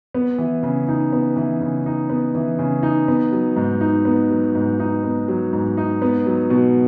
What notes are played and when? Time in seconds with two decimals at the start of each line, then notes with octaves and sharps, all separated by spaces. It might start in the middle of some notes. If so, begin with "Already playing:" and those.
0.15 B3
0.38 E3
0.63 C#3
0.88 D#4
1.13 B3
1.36 E3
1.61 C#3
1.86 D#4
2.10 B3
2.35 E3
2.59 C#3
2.83 D#4
3.08 B3
3.32 F#3
3.56 G#2
3.81 D#4
4.05 B3
4.30 F#3
4.55 G#2
4.80 D#4
5.03 B3
5.28 F#3
5.53 G#2
5.77 D#4
6.02 B3
6.26 F#3
6.50 B2